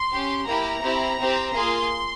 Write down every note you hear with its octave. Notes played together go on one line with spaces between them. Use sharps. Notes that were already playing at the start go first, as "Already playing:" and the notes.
Already playing: C6
C#4 G4
A#3 E4 G4 A#5
C4 E4 G4
C4 G4
A#3 F4 G#4 C6